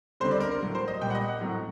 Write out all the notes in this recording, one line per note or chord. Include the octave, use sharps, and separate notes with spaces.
D3 G3 C4 D#4 C5
D5
A#4
A#4
A2 F#3 A#3
C5
D#5
A#2 G3 A#3 G5
F#5
D#5
F#5
A2 F#3 C4